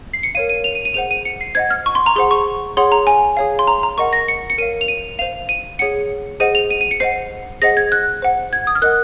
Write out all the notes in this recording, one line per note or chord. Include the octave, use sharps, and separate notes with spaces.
C7
C#7
A#4 C#5 F5 D#7
D#7
F7
D#7
D#7
G#4 C5 F#5 F7
D#7
C#7
C7
C5 D#5 F#5 G#6
F6
C#6
C6
A#5
G#4 C5 F#5 C6
C#6
G#4 C#5 F#5 C6
A#5
G#5
G#4 C#5 F5
C6
A#5
A#5
A#4 D#5 F#5 C#6
A#6
C#7
C#7
A#4 C#5 F5 D#7
F7
D#7
C5 F5 F7
D#7
G#4 C#5 F#5 C#7
G#4 C5 D#5 F#5 D#7
F7
D#7
D#7
C#7
C5 D#5 F#5 C7
G#4 C5 D#5 F#5 A#6
G#6
F#6
C5 F#5
G#6
D#6
F6
A#4 D#5 F#5 F#6